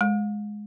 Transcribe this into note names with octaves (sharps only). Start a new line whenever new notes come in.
G#3